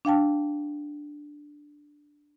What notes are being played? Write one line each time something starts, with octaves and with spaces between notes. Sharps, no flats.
D4 F5 G5 A5